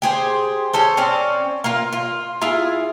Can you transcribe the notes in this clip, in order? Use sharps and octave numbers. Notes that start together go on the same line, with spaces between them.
G4 G#4 C5
C#4 A4 C5
C4 C#4 D5
A#3 F4
F4
E4 F4 G#4 F5